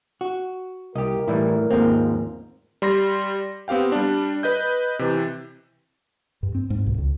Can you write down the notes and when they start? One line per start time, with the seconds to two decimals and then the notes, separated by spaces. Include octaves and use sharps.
0.21 F#4
0.95 C2 G4 A#4 D#5
1.28 A2 E3 G3 E4
1.71 D#2 G#2 F3 A#3 C4
2.82 G3 C6 A#6
3.68 B3 C4 G4 F5 G5
3.92 G3 D4
4.43 B4 D#5 G6
4.99 C3 E3
6.43 G2
6.55 C4
6.70 G#2
6.86 B1
6.98 C#2